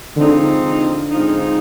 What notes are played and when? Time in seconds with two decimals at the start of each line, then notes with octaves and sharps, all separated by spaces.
0.16 G#2 D3 F3 C4 D#4
0.63 D3
1.11 G#2 F3 C4 D#4